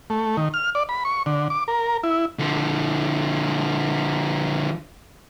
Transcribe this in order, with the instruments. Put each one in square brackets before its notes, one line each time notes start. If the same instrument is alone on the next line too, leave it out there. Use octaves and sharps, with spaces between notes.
[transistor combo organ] A3
D#3
F6
D5
B5
C#6
D3
D6
A#4
E4
[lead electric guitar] D3 F3